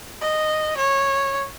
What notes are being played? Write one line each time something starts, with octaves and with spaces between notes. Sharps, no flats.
D#5
C#5